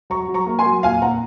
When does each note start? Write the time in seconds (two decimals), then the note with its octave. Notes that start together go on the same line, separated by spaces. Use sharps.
0.10 F#3 A#5 C#6
0.28 F#3
0.34 A#5 C#6
0.46 A#3
0.59 G#5 C6
0.65 F#3
0.83 A#2 F5 G#5
1.02 A#2 F#5 A#5